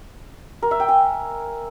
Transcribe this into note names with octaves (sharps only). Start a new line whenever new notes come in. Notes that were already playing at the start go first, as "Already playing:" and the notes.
A#4
E5
G5
G#5